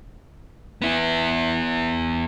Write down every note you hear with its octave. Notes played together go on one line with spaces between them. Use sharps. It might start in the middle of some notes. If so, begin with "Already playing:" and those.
B3 E4